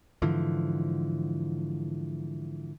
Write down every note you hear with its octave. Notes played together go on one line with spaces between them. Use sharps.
G#2 D3 E3 F3